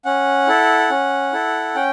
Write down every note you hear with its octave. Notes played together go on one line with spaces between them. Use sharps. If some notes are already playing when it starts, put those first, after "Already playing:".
C#4 F#5
E4 A4
C#4
E4 A4
C#4 G5